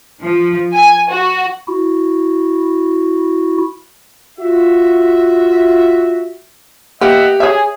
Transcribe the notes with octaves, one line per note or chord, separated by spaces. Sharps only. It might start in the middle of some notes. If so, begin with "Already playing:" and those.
F3
G#5
F#4
E4 F#4
F4 F#4 E5
A#3 B3 G4 D#5 E5 F#5
G#4 C#5 E5